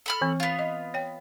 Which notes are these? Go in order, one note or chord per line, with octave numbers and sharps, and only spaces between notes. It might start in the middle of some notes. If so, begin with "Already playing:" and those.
A4 B5 F6
E3 C4
B3 F4
D#5
C#5 G5